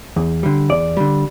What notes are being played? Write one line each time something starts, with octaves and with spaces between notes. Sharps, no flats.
E2
D3 G3
E2 D5
D3 G3